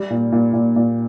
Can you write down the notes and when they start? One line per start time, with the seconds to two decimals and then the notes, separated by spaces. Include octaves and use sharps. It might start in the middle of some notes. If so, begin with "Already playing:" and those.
Already playing: G3
0.10 A#2
0.32 A#2
0.53 A#2
0.76 A#2